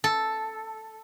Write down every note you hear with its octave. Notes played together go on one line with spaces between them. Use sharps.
A4